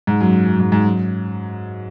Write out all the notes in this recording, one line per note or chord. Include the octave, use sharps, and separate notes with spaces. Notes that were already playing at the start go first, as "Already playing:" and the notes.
G#2
F#2
F#2
G#2
G#2
F#2